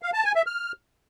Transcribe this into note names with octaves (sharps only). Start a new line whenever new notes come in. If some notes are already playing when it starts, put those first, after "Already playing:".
F5
A5
G#5
E5
F6